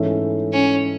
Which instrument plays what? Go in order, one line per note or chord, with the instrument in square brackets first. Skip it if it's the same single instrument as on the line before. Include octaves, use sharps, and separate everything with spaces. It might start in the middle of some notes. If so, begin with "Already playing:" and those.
Already playing: [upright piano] G#2 E3 A3 C#4
[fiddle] C#4